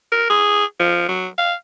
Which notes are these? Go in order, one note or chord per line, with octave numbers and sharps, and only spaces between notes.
A#4
G#4
F3
F#3
F5